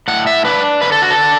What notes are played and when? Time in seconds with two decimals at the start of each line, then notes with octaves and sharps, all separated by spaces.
0.08 A2 F#5
0.27 E5
0.45 D4 B4
0.81 D3 B4
0.92 A4
1.02 F#4
1.11 A4
1.19 D4